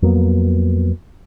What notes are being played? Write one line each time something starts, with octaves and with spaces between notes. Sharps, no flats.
F2 F#3 A#3 B3